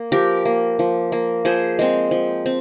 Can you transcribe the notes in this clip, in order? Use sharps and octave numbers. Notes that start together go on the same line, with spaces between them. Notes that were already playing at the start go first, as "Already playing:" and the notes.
Already playing: A#3
F3 G4 A#4
A#3
F3
A#3
F3 G#4 C5
G#3 C4
F3
C4